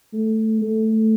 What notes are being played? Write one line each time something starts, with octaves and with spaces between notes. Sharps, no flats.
A3
A3